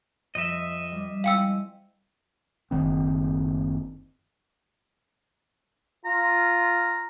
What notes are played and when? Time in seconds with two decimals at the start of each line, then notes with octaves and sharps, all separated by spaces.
0.35 F2 D#5 E5
0.92 G3
1.24 G#3 C4 E4 F5 G5 E6
2.71 F#1 D#3 C4
6.05 F4 A#5